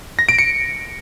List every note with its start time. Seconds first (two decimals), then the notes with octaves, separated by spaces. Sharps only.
0.19 A#6
0.29 D7
0.39 C#7